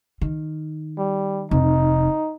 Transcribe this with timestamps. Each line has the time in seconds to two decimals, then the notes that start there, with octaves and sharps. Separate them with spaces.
0.21 D#3
0.98 G3
1.51 F1 D#4